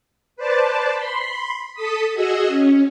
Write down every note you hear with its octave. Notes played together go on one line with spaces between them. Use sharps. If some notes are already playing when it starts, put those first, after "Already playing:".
B4 C5 D5 A5
B5 C6
A4 D#6 B6
F#4 G#4 D#5 E6
C#4